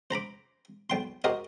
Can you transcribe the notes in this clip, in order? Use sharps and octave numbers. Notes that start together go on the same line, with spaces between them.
C5 A#5 B5 D6
B1 G5 C6
F#4 G4 A#4 C5 D#5